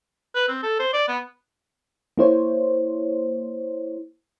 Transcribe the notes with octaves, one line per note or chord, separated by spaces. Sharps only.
B4
C4
A4
C5
D5
B3
A#3 E4 C5 C#5